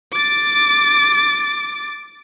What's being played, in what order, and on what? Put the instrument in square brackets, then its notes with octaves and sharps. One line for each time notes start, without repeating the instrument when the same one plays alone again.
[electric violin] D6 A6